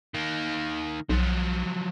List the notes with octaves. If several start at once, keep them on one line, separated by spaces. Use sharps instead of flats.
D#3 A#3
B1 F3 F#3